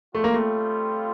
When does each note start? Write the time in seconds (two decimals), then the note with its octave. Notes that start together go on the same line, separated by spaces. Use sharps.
0.15 G3 A3 C4 F4
0.24 A#3
0.33 A3